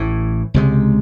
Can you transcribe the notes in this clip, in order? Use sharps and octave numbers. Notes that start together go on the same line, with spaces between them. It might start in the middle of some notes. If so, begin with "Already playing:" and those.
Already playing: A1 A2 E3
C#2 C3 F3 G#3